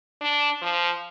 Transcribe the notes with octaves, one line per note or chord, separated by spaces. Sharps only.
D4
F3